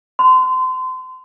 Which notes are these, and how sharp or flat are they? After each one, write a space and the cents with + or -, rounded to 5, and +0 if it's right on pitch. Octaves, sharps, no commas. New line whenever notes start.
C6 -30